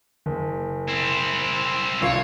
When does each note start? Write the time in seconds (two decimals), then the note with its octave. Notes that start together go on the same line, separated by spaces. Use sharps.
0.26 F#1
0.88 C4 E4
2.02 C2 F4 C#5 C7